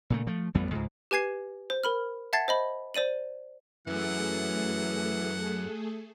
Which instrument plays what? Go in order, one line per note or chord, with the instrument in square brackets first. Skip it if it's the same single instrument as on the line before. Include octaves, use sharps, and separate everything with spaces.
[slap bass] A#2 C#3 A3
F3 A3
A1 F2 G3 B3
C#2 G#2
[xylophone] G4 B4 G#5 G#6 C7
C5
A#4 B5 F6
E5 F#5 A5 G#6 A6 C7
C5 D#5 B5
C5 D5 D#7 F#7
[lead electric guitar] F#2 [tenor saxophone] E3 [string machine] A3 G#4 A4 [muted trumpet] F#5